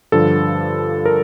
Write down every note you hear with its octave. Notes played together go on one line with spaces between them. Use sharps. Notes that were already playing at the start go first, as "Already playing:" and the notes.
G2 D3 F3 A4
A#4